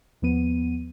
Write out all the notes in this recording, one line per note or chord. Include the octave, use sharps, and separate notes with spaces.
D#2 F3 B3 D#7